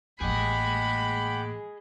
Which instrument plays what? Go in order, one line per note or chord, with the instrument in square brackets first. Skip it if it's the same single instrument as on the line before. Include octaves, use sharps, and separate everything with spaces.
[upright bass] A1 A#3 [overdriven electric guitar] G#4 D#5 [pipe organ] F#5 G5 D6 [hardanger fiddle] B5